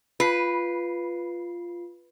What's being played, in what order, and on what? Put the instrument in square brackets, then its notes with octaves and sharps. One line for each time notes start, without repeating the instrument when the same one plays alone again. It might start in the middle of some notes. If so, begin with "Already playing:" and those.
[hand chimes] F4 C7 [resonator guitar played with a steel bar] B4